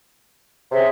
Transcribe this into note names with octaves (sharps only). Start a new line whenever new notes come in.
C3 G#4 C#5 E5